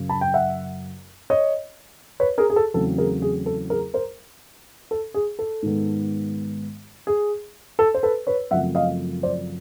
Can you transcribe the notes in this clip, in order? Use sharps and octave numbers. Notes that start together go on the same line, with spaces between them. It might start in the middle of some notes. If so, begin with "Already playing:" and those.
Already playing: F#2 C#3 F#3
A5 B5
G5
E5 F#5
C#5 D#5
B4 C#5
G#4 A#4
G#4
A4
E2 C#3 F#3 A3 C4 A4
G#4 A#4
G#4
A4
G#4 A#4
A#4 C5
A4
G#4
A4
G#2 D#3 G#3 B3
G#4
A4
C5
A4 B4
B4 C#5
F#2 C#3 F3 A3 C4 E5 F#5
D#5 F5
C5 D5